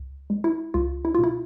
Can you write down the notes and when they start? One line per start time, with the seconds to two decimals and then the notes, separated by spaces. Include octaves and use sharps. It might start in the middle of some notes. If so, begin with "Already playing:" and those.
Already playing: C#2
0.30 G#3
0.44 E4
0.74 C#2 F4
1.05 E4
1.15 B2 F4
1.24 E4